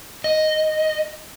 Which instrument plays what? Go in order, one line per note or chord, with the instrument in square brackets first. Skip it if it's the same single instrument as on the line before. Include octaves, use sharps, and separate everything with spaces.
[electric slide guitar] D#5